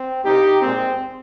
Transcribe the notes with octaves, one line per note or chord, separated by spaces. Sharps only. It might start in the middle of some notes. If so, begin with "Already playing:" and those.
Already playing: C4
C2 C3 G3 D#4 G4
A#2 G#3 C4